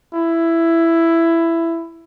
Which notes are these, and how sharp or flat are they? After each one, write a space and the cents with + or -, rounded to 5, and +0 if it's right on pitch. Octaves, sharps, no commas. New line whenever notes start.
E4 +10